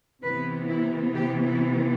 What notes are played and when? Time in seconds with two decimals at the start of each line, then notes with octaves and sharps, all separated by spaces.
0.22 C3 E3 B3 B4
0.68 E4
1.14 G4
1.45 E4